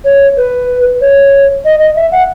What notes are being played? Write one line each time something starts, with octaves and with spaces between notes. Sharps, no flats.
C#5
B4
C#5
D#5
D#5
E5
F#5